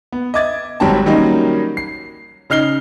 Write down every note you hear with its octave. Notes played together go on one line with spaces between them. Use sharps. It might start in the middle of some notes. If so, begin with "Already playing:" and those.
B3
D#5 E5 D6 G#6 A6
G#1 F#3 G3 C4 G5 A5
D#3 F#3 G3 A#3 C#4 D#4
C7
C#3 D#4 F6 C7 G7